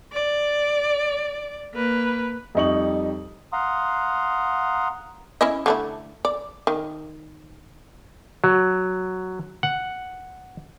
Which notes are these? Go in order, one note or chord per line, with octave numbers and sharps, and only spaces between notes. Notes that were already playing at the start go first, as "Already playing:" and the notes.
D5
A#3 B4
F2 G3 D#4 C#6 F#7
F5 F#5 A#5 C6 D#6
C#4 E4 D#5
D3 A3 E4
D5
D#3
F#3
F#5